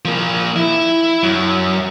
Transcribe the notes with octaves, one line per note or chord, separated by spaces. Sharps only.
F3 A#3
E4
F#2